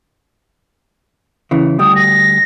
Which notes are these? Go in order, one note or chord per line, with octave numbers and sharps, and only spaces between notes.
C#3 E3
D2 G3 D#6
A#6